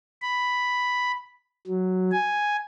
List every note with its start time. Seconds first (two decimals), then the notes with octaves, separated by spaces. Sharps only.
0.22 B5
1.67 F#3
2.12 G#5